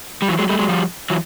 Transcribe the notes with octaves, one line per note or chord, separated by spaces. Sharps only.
G3
E3 F#3
F#3 G#3
G3 A3
F#3 G#3
F3 G3
E3 F#3